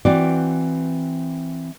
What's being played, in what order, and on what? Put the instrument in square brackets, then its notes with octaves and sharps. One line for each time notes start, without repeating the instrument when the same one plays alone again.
[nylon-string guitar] E3 C4 F#4 D5